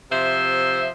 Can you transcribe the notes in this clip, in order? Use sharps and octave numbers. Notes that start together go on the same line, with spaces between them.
C3 F3 C5 E5